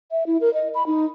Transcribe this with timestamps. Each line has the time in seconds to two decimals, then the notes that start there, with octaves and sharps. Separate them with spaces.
0.11 E5
0.27 E4
0.41 A#4
0.54 D#5
0.75 B5
0.87 D#4